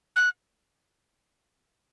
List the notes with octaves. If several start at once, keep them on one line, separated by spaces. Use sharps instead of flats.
F#6